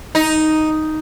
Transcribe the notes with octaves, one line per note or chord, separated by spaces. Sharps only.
D#4